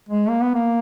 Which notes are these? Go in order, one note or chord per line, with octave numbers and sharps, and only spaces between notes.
G#3
A#3
B3
A#3